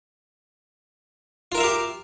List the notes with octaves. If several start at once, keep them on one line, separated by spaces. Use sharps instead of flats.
F4 G4 A#4 E5 F5